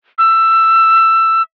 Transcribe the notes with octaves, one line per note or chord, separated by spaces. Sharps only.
E6